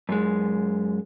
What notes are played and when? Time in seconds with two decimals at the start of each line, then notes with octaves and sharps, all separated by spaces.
0.09 F#2 G#3